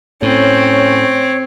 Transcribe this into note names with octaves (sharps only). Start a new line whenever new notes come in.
A2 C4 C#4 C#5